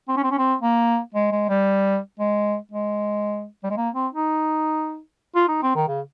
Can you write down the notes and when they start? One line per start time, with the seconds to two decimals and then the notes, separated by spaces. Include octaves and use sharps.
0.09 C4
0.17 C#4
0.23 C4
0.31 C#4
0.38 C4
0.62 A#3
1.14 G#3
1.32 G#3
1.49 G3
2.19 G#3
2.72 G#3
3.64 G3
3.70 G#3
3.77 A#3
3.95 C4
4.13 D#4
5.35 F4
5.48 D#4
5.62 C4
5.76 D#3
5.88 C#3